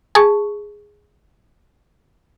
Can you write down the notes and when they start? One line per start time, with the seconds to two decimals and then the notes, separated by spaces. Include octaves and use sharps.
0.15 G#4 A5 C#6